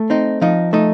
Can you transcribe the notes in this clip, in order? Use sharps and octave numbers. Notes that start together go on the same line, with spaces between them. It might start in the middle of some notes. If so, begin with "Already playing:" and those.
Already playing: A3
C4 D#4
F3 D#4
A3 D#4